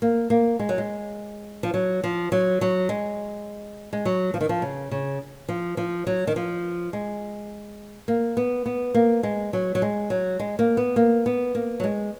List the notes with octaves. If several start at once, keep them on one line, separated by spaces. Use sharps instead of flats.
A#3
A#3
G#3
F#3
G#3
F3
F#3
F3
F#3
F#3
G#3
G#3
F#3
F3
D#3
F3
C#3
C#3
F3
F3
F#3
D#3
F3
G#3
A#3
B3
B3
A#3
G#3
F#3
F#3
G#3
F#3
G#3
A#3
B3
A#3
B3
A#3
F#3
G#3